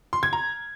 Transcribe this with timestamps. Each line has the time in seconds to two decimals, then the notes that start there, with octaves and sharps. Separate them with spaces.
0.13 C6
0.23 G#6
0.33 A#5